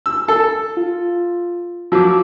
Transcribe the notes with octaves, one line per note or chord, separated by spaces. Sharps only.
E6
A4
F4
F3 F#3 D6 E6